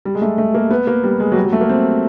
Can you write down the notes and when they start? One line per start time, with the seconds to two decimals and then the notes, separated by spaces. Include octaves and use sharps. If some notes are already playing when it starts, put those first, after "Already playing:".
0.05 G3
0.15 G#3
0.22 A3
0.38 A3
0.54 A#3
0.71 B3
0.87 A#3
1.04 G3
1.20 G#3
1.32 F#3
1.36 G3
1.44 F#3
1.52 A3
1.61 A#3
1.69 C4